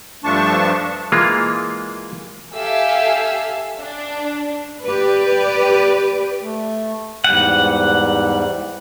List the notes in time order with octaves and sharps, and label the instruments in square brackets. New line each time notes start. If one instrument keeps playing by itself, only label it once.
[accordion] G2 F3 A3 D4 A5 C#6
[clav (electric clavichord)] E3 G#3 A#3 F4
[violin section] G4 A4 E5 F5 G#5 E6
D4
[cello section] G4 B4 D5
[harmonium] A3
[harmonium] E2 G#2 G3 [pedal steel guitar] F#5